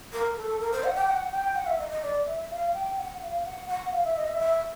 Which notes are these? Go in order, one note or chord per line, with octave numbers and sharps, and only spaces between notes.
A#4
A4
A#4
C5
F#5
G5
F#5
G5
F#5
E5
D#5
D#5
D5
E5
F5
G5
F#5
F5
F#5
F#5
F5
E5
D#5
E5
E5